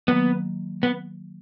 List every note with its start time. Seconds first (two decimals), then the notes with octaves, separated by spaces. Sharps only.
0.08 D#3 F#3 A#3 B3
0.83 B3